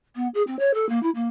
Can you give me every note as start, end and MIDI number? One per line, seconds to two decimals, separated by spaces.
0.16 0.28 59
0.34 0.43 68
0.47 0.58 60
0.59 0.74 73
0.74 0.88 69
0.89 1.01 58
1.03 1.10 64
1.15 1.29 58